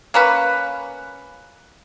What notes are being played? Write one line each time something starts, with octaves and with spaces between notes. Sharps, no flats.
A#3 C#4 B4